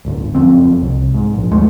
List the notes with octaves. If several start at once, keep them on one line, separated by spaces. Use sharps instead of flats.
D1 G1
F#1 F2 C4
C2
G#2
A#1
D#2 D#3 G#3 A3